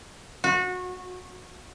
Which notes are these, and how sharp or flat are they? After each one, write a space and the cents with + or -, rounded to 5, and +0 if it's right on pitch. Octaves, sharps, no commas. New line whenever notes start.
F#4 -25